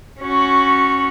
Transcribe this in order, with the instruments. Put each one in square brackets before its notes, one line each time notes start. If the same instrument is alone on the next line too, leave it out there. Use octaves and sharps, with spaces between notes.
[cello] C#4 F#4